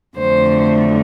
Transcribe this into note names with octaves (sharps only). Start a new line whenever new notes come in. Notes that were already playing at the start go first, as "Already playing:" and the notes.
F2 D3 F#3 A3 C5